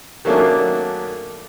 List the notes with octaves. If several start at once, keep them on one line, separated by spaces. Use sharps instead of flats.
D#3 F#3 A3 A#3 C#4 D4